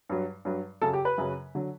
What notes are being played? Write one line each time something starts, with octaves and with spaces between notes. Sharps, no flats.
G2 F#3
G2 F#3
F#2 C#3 F#3 A4
G4
B4
F#2 C#3 F#3
D3 F#3